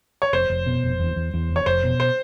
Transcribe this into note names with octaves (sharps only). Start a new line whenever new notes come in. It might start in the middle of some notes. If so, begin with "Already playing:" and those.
C#5
F1 C5
F1
B2
F1
E2
E2
E2
F1
C#5
F1 C5
B2
C5